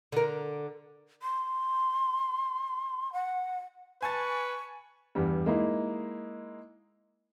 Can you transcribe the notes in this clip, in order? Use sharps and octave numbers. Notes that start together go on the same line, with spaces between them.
D3 A#4
C6
F#5
B4 G#5 A5 C#6 A6
E2 G2 G3
G#3 A#3 D#4 E4